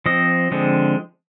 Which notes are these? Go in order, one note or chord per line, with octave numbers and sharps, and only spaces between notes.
F3 C4 D#5
D3 F3 G#3 C4